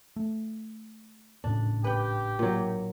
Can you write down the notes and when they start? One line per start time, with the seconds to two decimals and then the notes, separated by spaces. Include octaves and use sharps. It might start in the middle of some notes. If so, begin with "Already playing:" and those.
0.16 A3
1.44 G#1 A2 C#3 D4
1.84 G4 B4 G5
2.39 A#2 F#3